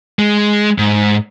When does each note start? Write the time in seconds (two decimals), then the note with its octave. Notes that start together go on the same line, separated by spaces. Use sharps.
0.19 G#3
0.78 G#2